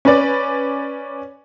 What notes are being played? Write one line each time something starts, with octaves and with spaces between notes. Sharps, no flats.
C#4 B4 D5